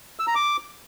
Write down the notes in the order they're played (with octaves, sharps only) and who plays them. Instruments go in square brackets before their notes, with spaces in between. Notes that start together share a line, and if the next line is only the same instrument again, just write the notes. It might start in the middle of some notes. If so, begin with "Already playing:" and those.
[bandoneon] E6
A#5
D6